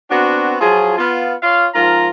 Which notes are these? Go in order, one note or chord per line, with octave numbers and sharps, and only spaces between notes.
B3 C4 D4 F#4
F3 F#3 F4 G#4
B3 F4
F4 C#5 F5
G#2 F3 F4 A#4 A#5